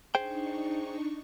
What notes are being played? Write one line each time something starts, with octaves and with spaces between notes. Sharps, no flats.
D4 D#4 G#4 C5 G5 C#6